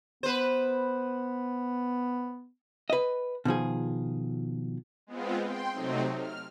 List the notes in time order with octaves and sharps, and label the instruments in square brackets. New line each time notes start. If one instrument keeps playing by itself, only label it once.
[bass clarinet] B3 [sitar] B4 C5
[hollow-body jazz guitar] B4 D#5
B2 D#3 F3 G#4
[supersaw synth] G#3 B3 C4 F4
G5 C6
C3 F#3 A3 C4 D#4
F6